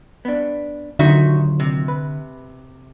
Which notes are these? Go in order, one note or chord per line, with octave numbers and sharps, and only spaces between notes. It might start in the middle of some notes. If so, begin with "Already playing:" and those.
B3 D4
D#2 A#2 D3 F#3 D#4 F#4 E5
C3
B4